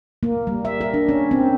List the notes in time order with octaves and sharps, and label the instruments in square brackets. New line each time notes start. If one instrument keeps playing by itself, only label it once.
[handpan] A#3
G3
E5
A#4
D4
C#4
C4